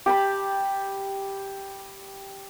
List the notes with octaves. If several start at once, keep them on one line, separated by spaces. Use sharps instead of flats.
G4 A5 B5